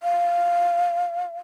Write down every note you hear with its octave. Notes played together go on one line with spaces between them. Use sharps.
F5